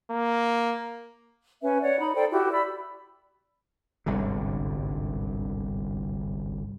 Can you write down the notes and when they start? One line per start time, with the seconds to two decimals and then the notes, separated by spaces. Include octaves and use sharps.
0.11 A#3
1.61 C#4 B4 E5
1.82 C#5 D5 F#5
2.00 D#4 B5
2.16 A4 C5 D5 G5
2.30 E4 F#4 G4
2.52 D5 B5 E6
4.06 G1 C2 G#2 D3